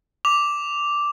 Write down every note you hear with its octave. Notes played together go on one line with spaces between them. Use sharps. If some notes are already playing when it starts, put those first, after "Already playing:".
D6 F7